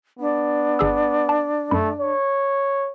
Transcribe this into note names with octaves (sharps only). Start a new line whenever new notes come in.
B3 D4
G1 G#4 E6
A5
F#2 A3 B5
C#5